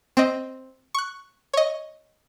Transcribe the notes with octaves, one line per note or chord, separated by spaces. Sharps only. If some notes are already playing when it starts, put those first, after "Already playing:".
C4 D#5
C#6 F#6
C#5 D#5